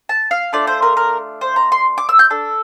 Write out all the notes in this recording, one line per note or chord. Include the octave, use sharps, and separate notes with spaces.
A5
F5
A3 D4 F4 D5
C5
A#4
A#4
C5
A#5
C6
D6
E6
G6
D4 A4